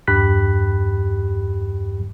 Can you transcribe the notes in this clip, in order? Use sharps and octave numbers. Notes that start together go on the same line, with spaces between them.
E2 G2 G4 B5 F#6 B6